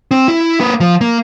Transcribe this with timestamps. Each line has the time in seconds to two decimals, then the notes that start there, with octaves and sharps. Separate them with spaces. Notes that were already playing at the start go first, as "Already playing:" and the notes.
0.11 C4
0.28 E4
0.60 A#3 B4
0.80 F3
1.01 A#3